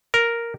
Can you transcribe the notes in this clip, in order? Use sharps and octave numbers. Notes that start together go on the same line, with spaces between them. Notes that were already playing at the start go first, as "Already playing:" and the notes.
A#4